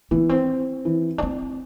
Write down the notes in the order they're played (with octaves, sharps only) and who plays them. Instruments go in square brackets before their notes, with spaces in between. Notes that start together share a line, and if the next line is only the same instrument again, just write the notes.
[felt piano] E3 [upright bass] B3
[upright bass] C4
[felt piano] E3
[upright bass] D4
C4